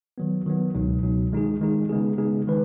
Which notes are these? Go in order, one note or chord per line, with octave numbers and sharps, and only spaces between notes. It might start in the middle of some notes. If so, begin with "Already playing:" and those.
D#3 F#3 B3
D#3 F#3 B3
C#2 B2 F#3 D#4
C#2 B2 F#3 D#4
D#3 G#3 D#4 G#4
D#3 G#3 D#4 G#4
C#3 G#3 B3 D#4 G#4
C#3 G#3 B3 D#4 G#4
D#3 G#3 D#4 B4